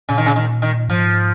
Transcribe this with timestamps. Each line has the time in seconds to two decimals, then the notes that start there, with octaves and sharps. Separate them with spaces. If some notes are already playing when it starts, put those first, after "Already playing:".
0.09 A#2 C#3
0.17 D#3
0.26 C#3
0.36 D#3
0.62 D#3
0.89 G#2 F3